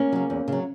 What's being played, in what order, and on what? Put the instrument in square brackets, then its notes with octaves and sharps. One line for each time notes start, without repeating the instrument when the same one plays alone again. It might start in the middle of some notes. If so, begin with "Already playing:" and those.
Already playing: [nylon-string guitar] A#3 C#4
C#3 F#3
E2
C#3 F#3